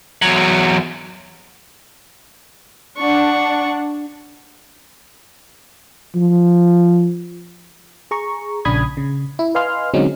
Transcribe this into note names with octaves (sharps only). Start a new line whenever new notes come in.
E2 F#3
D4 F#5 C#6
F3
G#4 A#5 C#6
A#1 C#3 D4 B5 D#6 G#6
C#3
E4
B4 D#5 F5 G#5 C6 F6
D3 F#3 G#3 C4 C#4 D#4